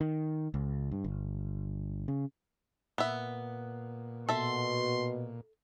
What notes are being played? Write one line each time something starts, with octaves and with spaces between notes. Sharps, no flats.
D#3
C#2
G2
G1
C#3
A#2 B3 E5
B2 A4 E5 C6